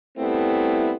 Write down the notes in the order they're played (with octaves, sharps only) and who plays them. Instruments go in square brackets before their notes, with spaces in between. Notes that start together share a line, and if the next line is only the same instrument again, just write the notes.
[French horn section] G3 A3 B3 C4 E4